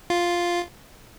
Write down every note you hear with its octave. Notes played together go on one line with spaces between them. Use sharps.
F4